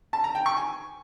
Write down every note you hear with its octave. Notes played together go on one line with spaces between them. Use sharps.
A5
A#5
G5
C#6
G#5